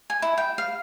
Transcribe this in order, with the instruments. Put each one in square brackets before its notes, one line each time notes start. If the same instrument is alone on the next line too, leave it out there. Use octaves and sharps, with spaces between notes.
[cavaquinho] G#5
E4
G5
F5